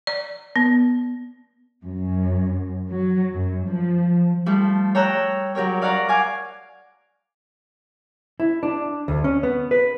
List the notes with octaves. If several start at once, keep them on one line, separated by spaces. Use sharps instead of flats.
D5
B3
F#2
F#3
F#2
F3
F3 G3 A3
C#5 G5 A#5 E6 F#6
F#3 G4 A#4 C#5
D5 F5 F#5 A#5 C#6
F5 G#5 D6
E4
D4
D2
C#4
B3
B4